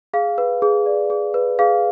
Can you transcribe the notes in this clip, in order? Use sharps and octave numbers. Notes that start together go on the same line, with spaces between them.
G#4 F5
B4
G#4
D5
G#4
B4
G#4 F5